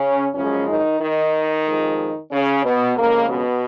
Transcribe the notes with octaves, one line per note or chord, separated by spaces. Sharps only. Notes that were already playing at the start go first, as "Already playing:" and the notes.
Already playing: C#3 C#4
F#2 C#3 F3 G#3 C#4
D#3 D#4
D#3 D#4
F2 F3 G#3
C#3 C#4
B2 B3
F2 C#3 G#3 A#3
B2 B3